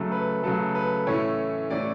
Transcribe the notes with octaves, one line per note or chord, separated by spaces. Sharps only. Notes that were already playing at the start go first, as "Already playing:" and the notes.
Already playing: C#3 F#3 A3 A4
B4
C#3 F#3 A3 A4
B4
A2 E3 A3 C#4 C#5
A2 E3 A3 C#4 D5